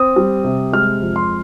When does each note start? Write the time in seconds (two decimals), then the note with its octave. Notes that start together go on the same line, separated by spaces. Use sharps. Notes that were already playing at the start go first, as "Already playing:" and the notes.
Already playing: C4 D#6
0.16 G3
0.44 C3
0.73 G#3 F6
1.02 F2
1.16 C6